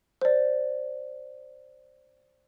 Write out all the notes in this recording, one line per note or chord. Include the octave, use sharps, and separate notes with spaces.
C5 D5